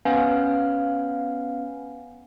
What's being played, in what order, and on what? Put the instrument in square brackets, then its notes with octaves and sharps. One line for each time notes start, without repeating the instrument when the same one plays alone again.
[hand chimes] B3 C#4 B4 F5 F#5 G#5